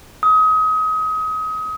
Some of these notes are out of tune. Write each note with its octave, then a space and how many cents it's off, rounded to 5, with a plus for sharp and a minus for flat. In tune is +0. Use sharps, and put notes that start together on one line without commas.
D#6 +30